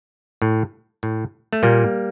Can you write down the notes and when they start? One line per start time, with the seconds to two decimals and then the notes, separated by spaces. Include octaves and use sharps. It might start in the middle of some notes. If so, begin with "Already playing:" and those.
0.42 A2
1.03 A2
1.53 A3
1.63 A#2 G3 A#3